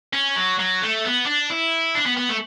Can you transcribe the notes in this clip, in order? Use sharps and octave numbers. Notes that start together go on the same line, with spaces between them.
C#4
F#3
F#3
A3
B3
D4
E4
D4
B3
B3
A3